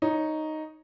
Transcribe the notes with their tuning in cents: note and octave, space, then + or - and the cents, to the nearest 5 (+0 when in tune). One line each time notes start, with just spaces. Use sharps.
D#4 +0 C#5 +0